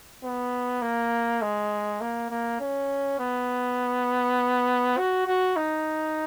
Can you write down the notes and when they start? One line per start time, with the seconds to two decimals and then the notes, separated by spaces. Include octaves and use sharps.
0.24 B3
0.82 A#3
1.42 G#3
2.01 A#3
2.31 A#3
2.60 C#4
3.20 B3
4.98 F#4
5.27 F#4
5.57 D#4